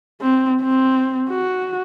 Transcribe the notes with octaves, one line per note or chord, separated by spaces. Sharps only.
C4
C4
F#4